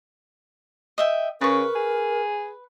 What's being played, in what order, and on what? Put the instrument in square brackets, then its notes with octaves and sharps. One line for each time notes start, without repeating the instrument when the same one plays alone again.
[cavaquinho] D#5 E5 G5
[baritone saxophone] C#3 [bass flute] A#4 [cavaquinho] B4 C#6
[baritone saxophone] G#4